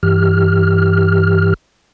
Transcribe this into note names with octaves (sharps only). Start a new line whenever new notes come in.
G2 E3 G4 F6